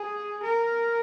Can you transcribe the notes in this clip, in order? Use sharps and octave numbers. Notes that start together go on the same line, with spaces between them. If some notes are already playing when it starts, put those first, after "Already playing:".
Already playing: G#4
A#4